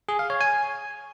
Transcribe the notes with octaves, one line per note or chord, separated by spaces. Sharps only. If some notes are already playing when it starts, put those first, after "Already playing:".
G#4
F5
C#5
G#5